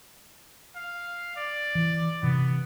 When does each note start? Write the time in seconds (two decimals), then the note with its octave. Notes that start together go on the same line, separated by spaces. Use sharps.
0.75 F5
1.36 D5
1.75 E3
2.23 C3 E3 B3